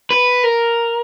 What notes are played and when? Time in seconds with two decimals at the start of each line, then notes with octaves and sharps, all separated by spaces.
0.10 B4
0.43 A#4